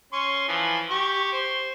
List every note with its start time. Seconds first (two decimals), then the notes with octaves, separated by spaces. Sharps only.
0.13 C#4 C6 C#6
0.48 E3 F3
0.90 G4 C#6
1.33 C5